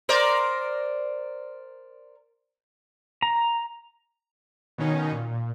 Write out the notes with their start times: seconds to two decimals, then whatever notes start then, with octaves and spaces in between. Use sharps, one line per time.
0.09 A#4 C5 D5
3.22 A#5
4.78 B2 D#3 C#4 D#4
5.12 A#2